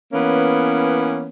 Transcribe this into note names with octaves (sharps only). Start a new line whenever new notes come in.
E3 A#3 B3 C#4